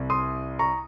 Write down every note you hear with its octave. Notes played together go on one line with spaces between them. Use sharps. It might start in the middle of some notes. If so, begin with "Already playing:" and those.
Already playing: C2 C3
C6 D#6
A#5 C#6